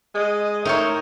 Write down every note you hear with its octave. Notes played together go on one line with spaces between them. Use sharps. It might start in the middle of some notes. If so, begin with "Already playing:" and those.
G#3 D#5
A2 D#4 A#4 C5 C#5